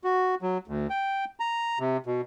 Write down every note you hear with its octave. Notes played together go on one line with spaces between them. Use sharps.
F#4
F#3
D2
G5
A#5
C3
B2